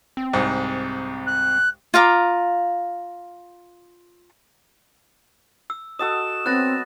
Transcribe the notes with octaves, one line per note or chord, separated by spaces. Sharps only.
C4
C2 G#2
F#6
F4 F5 A#5 D6
E6
F#4 A4 D#5 D#6 E6 E7
F#3 B3 C4 F#5 F#6 A6 A#6